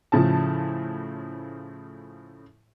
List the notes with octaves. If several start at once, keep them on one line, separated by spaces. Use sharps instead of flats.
A2 C#3 F3 A5